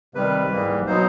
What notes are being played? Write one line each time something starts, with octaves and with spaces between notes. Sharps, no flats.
C3 D#3 G3 B4
G#2 E3 G3 A#3
B2 F#3 B3 D#4 C5